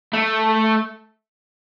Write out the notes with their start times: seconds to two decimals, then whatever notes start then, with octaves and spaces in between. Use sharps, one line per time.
0.13 A3